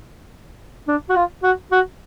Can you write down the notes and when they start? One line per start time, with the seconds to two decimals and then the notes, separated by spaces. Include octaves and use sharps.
0.88 D4
1.09 F#4
1.16 F4
1.43 F#4
1.72 F#4